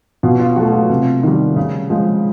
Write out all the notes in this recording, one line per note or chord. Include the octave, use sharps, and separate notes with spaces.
B2 F4
F4
F#3 A3 F#4
F4
C3
D#3 G3
C#3
F3 G#3